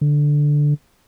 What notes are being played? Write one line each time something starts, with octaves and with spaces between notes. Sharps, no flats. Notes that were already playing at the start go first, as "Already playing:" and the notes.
D3